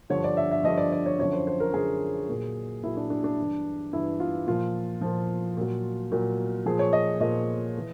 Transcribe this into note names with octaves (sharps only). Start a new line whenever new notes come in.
G2 D3 F3 C#5
D5
E5
E5
G2 D3 F3 D#5
D5
D5
C#5
F#2 D3 F3 C#5
C5
C5
A#4
F#2 D3 F3 G#4
A#2 F#3
A#2 F#3 E4
D4
D4
D4
G2 E3
G2 E3 E4
F4
A#2 F3 F4
A#2 F3
A#2 F#3
A#2 F#3
A#2 F3 G#4
C#5
D#5
A#2 F3 D#5
E3